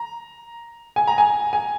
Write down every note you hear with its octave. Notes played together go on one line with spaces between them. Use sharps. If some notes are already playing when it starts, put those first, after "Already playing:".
Already playing: A#5
G#5
A#5
G#5
G#5